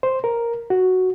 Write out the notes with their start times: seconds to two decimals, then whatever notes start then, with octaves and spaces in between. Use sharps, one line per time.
0.03 C5
0.24 A#4
0.70 F#4